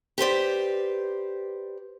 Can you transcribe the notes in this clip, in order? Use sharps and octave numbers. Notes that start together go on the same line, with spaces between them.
G4 B4 C5 D5